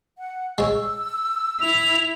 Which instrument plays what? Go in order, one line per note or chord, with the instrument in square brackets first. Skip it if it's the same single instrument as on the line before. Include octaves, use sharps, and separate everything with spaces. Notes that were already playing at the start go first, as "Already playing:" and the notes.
[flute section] F#5
[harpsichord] G#3 C#5 [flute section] E6
[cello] E4 [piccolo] F7